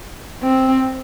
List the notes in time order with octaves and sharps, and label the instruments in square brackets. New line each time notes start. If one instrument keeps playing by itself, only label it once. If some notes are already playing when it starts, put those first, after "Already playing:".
[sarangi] C4